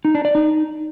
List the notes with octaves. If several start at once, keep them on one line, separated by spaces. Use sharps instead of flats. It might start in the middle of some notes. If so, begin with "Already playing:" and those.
D#4
D4
D5
D#4